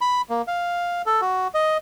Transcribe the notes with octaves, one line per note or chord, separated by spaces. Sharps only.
B5
A#3
F5
A4
F#4
D#5